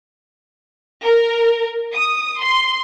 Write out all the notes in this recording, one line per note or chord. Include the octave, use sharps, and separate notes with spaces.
A#4
D#6
C6